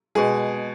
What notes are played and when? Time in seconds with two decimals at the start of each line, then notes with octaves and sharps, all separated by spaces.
0.15 B2 G#3 G#4